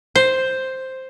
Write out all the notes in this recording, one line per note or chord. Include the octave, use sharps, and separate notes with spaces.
C5